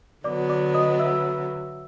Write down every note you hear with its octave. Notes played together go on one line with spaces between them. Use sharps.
D3 F#3 B3 D5 D6
D5 D6
D#5 D#6
E5 E6